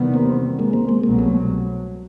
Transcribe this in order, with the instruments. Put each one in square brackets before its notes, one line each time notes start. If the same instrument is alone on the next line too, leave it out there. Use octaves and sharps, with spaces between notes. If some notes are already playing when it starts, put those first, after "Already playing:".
Already playing: [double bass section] E2 C3 D#3 G3 B3
[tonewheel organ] A#3 C4
G#3 A#3
A#3 C4
G#3 A#3
[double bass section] C2 B2 F#3 [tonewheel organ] G#3 A#3
[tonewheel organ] A3 B3